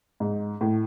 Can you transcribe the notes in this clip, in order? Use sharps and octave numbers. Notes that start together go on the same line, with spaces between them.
G#2
A2